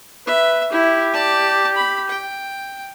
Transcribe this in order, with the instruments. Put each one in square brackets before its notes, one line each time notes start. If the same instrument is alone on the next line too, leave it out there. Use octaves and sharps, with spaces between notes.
[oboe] B4 [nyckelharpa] E5
[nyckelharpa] E4 [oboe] G4
[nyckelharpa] D5 A5
B5
G5